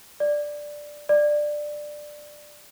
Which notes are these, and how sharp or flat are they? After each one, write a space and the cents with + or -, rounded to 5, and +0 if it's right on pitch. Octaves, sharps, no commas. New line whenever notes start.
D5 +5
D5 +15